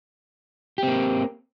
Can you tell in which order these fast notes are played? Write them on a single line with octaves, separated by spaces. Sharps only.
G4 C4 A#3